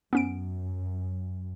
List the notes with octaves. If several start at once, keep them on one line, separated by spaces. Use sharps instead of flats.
F#2 B3 C#4 D7